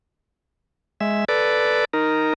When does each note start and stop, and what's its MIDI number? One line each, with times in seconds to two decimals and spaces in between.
1.01 1.25 56
1.01 1.25 76
1.29 1.85 69
1.29 1.85 71
1.29 1.85 74
1.93 2.33 63
1.93 2.33 70